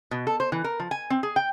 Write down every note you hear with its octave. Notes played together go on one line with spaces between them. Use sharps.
B2
A4
C5
E3
A#4
F3
G#5
C4
G#4
G5